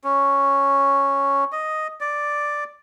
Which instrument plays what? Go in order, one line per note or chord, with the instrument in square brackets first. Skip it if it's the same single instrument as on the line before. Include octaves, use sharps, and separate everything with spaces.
[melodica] C#4
D#5
D5